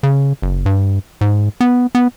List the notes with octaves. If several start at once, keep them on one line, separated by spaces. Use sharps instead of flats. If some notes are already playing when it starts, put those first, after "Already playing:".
C#3
F#1
G2
G#2
B3
B3